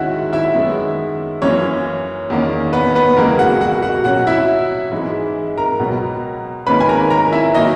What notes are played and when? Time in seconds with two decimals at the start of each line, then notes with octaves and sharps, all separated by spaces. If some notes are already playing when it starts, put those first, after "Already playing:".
Already playing: D#2 D#3 G#3 C#4 E4 F#4 E5 F#5
0.33 E4 E5
0.54 F#2 D#3 G#3 B3
1.42 F#2 E3 A#3 C#4 C#5
2.30 E2 D#3 A#3 C#4
2.73 B3 B4
2.95 B3 B4
3.17 C#2 C#3 E3 G#3 A#3 A#4
3.39 F#4 F#5
3.61 F#4 F#5
3.82 F#4 F#5
4.04 B2 F#3 C#4 F#4 F#5
4.27 E4 E5
4.92 G#2 E3 G#3
5.58 A#4 A#5
5.79 C#2 B2 F#3 B3
6.67 G#2 D#3 A#3 C#4 B4 B5
6.80 G#5
6.89 A#4 A#5
7.10 A#4 A#5
7.32 E4 E5
7.55 D#3 F#3 A#3 D#4 D#5